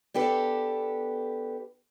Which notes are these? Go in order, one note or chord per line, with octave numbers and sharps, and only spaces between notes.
B3 D4 G4 A4 B4